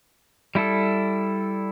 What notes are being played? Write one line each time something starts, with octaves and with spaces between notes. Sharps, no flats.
G3 E4 A4